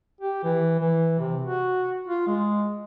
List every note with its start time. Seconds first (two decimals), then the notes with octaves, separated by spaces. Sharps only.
0.21 G4
0.43 E3
0.79 E3
1.19 C3
1.42 F#4
2.06 F4
2.27 G#3